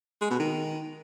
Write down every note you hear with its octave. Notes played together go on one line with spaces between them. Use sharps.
G#3
B2
D#3